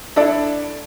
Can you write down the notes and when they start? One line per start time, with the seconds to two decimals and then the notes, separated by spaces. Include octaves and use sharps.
0.16 D4 E4 A4 D5